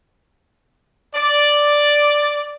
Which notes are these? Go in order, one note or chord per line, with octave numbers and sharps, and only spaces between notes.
D5